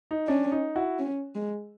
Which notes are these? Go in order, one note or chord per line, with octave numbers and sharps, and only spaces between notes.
D#4
C#4 D4
D#4
E4 F#4
C#4
G#3